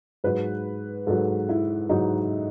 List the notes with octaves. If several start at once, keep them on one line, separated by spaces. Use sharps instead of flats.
G#2 F#3 B4
G#2 F#3 A4
E4
G#2 F#3 D#4